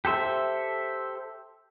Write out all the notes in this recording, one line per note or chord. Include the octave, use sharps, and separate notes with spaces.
G4 A4 C5 E5